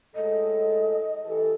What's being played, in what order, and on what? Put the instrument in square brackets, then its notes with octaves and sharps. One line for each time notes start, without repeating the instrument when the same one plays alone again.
[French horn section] A2 G#3 A4 [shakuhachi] D#5
[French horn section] E3 G4 A4